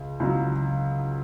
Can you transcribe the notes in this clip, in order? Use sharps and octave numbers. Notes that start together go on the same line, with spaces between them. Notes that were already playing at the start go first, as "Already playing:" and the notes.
Already playing: C#2 C#3
C#2 C#3 F#3